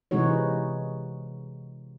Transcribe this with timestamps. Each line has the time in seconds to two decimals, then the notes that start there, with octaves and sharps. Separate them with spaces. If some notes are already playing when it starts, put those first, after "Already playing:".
0.11 C3 E3 G#3 D#4 F#4 C#5